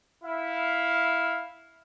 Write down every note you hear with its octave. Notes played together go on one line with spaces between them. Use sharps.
E4 F5